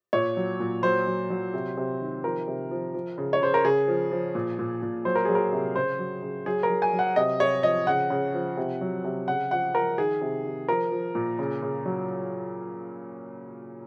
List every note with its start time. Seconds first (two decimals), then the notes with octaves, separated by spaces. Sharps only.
0.13 A#2 C#5
0.37 F#3
0.60 A#2
0.83 F#3 C5
1.07 F#3
1.30 F#3
1.54 C3
1.77 C3
2.01 D#3
2.24 F3 A#4
2.48 C3
2.71 F3
2.94 F3
3.18 C#3
3.33 C#5
3.41 C#3 C5
3.54 A#4
3.64 C#3 G#4
3.88 F3
4.12 F3
4.35 A#2
4.59 A#2
4.82 A#2
5.05 F#3 C5
5.15 A#4
5.25 F#3 G#4
5.35 A#4
5.52 C3
5.76 C#3 C5
5.99 F#3
6.23 C#3
6.46 F#3 G#4
6.63 A#4
6.70 F#3
6.82 G#5
6.93 F#3
6.99 F#5
7.16 C3 D#5
7.40 C3 C#5
7.63 F3 D#5
7.87 C#3 F#5
8.10 C#3
8.34 F3
8.57 C3
8.81 F#3
9.04 C3
9.28 C#3 F#5
9.51 F3 F#5
9.75 F3 A#4
9.98 D#3 G#4
10.22 C3
10.45 C3
10.68 F3 A#4
10.92 F3
11.15 A#2
11.39 C#3
11.62 C#3
11.86 F#3